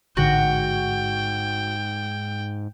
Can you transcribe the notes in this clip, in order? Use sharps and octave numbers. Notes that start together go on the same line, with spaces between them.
A1 G#2 D3 F#4 G5